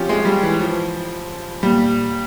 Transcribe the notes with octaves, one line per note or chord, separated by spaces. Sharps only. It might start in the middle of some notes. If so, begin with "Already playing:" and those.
Already playing: F3 C4 C#4 F4 G4
G#3
G3
E3
F3
A#2 G3